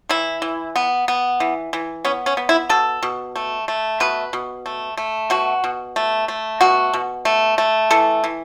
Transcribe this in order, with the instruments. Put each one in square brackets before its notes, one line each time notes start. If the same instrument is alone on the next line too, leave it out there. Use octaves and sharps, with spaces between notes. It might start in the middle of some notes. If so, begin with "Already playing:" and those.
[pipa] E3 E4
E3
B3
B3
E3
E3
B3 C#4
C#4
B3
E4
B2 A4
B2
A3
A3
B2 B4
B2
A3
A3
B2 F#4
B2
A3
A3
B2 F#4
B2
A3
A3
E3 A4
E3